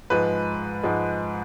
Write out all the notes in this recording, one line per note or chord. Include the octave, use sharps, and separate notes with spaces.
G#2 F3 G#3 B4
G#2 F3 G#3